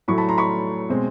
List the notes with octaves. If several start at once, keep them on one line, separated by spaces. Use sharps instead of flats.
A2 F#3 A3 B5 C#6
A5 B5
A#5 C6
B5 C#6
B2 G#3 C4